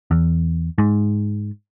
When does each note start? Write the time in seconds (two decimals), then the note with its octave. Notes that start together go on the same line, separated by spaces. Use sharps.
0.11 E2
0.78 G#2